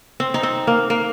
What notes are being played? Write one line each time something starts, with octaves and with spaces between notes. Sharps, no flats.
C4
D#4
C4
A#3
A#3